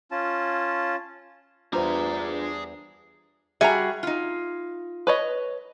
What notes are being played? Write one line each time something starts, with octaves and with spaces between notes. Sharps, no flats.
C#4 F4 A5
E2 G3 D4 F4 G#4 B4 C5 A#5
G3 F#4 G#4 E5 A#5
D#4 F4
B4 C#5 D#5